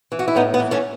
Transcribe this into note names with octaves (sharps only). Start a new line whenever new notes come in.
E3
F#4
E4
A2 B3 D#4
B3
E3
A3 C#4